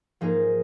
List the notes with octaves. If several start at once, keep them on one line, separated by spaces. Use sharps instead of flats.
G#2 F3 A#3 D#4 G#4